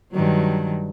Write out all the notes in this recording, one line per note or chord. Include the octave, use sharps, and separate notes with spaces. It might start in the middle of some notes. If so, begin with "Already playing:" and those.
G2 D#3 F#3